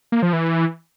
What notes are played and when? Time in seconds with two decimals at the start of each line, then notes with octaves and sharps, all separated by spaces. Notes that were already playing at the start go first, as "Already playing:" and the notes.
0.12 A#3
0.23 F3
0.33 E3